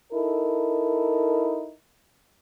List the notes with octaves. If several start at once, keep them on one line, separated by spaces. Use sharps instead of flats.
D#4 E4 A4 A#4